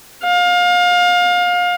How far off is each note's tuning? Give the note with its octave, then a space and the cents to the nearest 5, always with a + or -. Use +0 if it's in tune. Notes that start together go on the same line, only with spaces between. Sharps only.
F5 +30